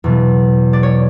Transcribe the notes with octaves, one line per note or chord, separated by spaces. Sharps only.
E2 B2 F#3
D5
C#5